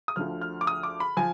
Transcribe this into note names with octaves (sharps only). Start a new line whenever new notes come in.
D#6
D2 D3 F3 F6
F6
D6
D#6
D6
B5
F3 G#5